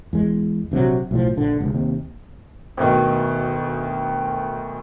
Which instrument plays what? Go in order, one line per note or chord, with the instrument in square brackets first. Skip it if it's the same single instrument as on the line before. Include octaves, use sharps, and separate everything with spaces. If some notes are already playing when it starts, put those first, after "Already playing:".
[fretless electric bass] E2 G#3
A#1 C3 F3 F#3
B1 A2 F3
A#1 D3
F1 C#2
D#2 C3
[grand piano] D2 B2 D#3